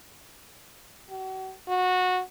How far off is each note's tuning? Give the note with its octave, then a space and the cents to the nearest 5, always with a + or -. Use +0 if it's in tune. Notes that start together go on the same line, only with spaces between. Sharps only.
F#4 +40
F#4 -15